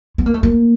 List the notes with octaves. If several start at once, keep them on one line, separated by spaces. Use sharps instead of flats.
B3
A#3
A3
A#3